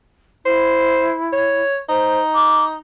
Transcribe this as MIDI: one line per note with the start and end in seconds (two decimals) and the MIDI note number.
0.45 1.63 64
0.45 1.14 72
1.32 1.77 73
1.89 2.75 63
1.89 2.20 72
2.35 2.64 86